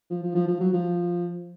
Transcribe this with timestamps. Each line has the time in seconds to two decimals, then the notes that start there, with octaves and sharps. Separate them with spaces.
0.10 F3
0.23 F3
0.35 F3
0.48 F3
0.60 F#3
0.73 F3